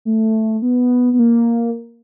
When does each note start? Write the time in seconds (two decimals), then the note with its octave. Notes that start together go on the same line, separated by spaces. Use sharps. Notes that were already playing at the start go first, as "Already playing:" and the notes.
0.05 A3
0.62 B3
1.13 B3
1.19 A#3